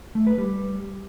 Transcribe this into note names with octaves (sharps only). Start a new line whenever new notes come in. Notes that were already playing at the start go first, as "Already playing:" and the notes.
A3
B4
G3